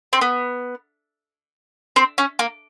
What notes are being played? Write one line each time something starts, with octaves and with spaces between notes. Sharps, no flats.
C4
B3
C4
C#4
A#3